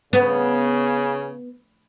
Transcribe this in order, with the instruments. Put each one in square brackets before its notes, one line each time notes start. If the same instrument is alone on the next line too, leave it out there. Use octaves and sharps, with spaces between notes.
[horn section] C#3 [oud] B3